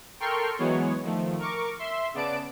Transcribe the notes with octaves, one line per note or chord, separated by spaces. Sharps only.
A4 A#4 G5 C6 C#6 F6
E3 F#3 G#3 B3 C#5
D#3 F3 A3
A#4 C#6 D6
E5 C6
C#3 B3 D5 A5 D7